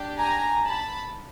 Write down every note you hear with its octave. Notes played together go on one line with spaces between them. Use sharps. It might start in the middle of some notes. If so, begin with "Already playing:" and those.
Already playing: D4 G4
G#5 A#5
A5 B5